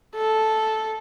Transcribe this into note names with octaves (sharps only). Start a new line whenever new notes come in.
A4